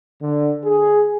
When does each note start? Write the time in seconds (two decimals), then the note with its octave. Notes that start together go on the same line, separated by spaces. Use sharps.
0.21 D3
0.63 G#4